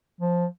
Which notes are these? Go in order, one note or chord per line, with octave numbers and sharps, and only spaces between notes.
F3